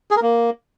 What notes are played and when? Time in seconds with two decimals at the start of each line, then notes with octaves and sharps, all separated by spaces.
0.11 G#4
0.16 A#4
0.22 A#3